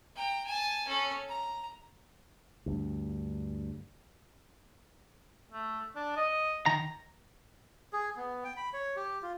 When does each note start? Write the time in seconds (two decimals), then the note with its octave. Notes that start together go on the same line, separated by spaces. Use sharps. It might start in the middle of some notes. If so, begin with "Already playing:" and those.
0.16 G5 A#5
0.47 G#5 A5
0.88 C#4 A4
1.28 A#5
2.66 D2 G2
5.52 A3
5.96 D4
6.17 D#5
6.66 D#3 A#5
7.93 G#4
8.17 B3
8.44 G5
8.57 B5
8.73 C#5
8.96 G4
9.23 F4